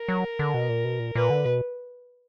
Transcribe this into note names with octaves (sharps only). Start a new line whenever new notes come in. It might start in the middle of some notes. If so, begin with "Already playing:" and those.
Already playing: A#4
F#3
D3
B2
A#2
B2
A#2
A#2 B4
D3
B2